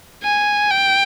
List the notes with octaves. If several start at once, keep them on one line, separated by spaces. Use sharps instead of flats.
G#5
G5